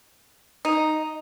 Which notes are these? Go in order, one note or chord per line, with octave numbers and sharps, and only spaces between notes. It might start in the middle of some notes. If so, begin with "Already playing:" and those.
D#4